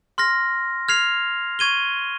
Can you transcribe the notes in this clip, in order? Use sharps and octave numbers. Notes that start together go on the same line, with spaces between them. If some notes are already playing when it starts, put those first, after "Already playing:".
C6 F6 A#6
F6 G#6 C7 F7
C#6 G#6 D#7 G7